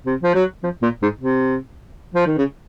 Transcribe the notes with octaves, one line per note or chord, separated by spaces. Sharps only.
C3
F3
F#3
F3
A#2
G#2
C3
F3
D#3
C#3